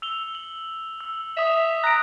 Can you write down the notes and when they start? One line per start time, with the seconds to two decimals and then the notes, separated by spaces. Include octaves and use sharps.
0.02 E6 F7 G7
0.35 F#7
1.01 E6
1.37 E5 D#6 B6 F7
1.83 A#5 F#6 D7